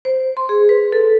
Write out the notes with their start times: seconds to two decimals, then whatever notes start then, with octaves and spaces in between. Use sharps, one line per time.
0.05 C5
0.37 C6
0.49 G#4
0.69 B4
0.92 A4